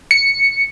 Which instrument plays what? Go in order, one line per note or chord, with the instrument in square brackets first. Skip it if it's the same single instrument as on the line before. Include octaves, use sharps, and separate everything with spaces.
[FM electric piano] C#7